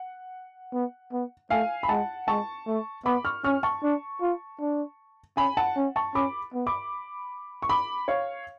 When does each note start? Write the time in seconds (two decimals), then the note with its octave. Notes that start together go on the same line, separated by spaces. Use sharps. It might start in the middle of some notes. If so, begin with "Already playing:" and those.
Already playing: F#5
0.73 B3
1.12 B3
1.50 A3 F5 G#5
1.83 B5
1.89 G#3 F#5 A5
2.28 G#3 A5 C#6
2.67 A3
3.05 B3 B5 D6
3.25 C#6 F6
3.44 C#4 C#6 F6
3.63 A5 C#6
3.83 D4
4.21 F4
4.60 D4
5.37 C#4 G#5 B5
5.57 F#5 A5
5.76 C#4
5.96 A5 C#6
6.15 C#4 B5 D6
6.54 B3
6.66 B5 D6
7.62 C#6
7.69 B5 D6
8.08 C#5 F5